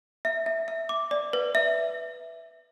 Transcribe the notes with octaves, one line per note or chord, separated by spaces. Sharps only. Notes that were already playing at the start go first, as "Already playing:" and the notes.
E5
E5
E5
D6
D5
B4
E5